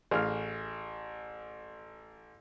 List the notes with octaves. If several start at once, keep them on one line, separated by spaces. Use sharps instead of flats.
A1 G#4 F5 F6